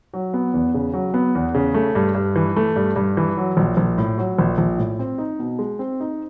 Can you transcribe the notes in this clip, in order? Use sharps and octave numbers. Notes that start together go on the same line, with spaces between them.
F#3
B3
E2
C#3
F#3
B3
E2
C#3
A3
G2
G2
E3
A3
G2
G2
E3
F#3
A#1
A#1
A2
F#3
A#1
A#1
A2
C4
D#4
B2
G#3
C4
D#4